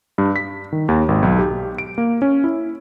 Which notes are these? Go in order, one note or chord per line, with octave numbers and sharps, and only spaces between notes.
G2
B6
D#3
D#2
G#1
B1
G4
D7
A#3
C#4
E4